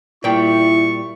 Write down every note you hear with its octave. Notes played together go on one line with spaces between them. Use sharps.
A#2 G3 E4 G5 C#6